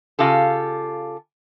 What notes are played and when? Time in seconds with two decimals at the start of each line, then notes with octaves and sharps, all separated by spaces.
0.19 C#3 F4 G4 A4